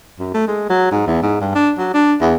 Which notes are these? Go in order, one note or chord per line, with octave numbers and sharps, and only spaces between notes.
F#2
A3
G#3
F#3
G#2
E2
G#2
G2
D4
F#3
D4
E2